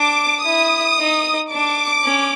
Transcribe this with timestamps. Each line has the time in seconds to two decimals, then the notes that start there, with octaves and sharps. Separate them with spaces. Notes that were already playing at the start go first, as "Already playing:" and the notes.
Already playing: D4 D6
0.44 E4 D#6
0.98 D#4
1.52 D4 D6
2.04 C#4